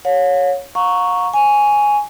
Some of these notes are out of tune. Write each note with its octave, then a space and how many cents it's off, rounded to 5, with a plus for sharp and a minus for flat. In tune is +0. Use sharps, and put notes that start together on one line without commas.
C#5 +0 F5 +45
F5 +45 A#5 +0 C#6 +0
G#5 +0 C#6 +25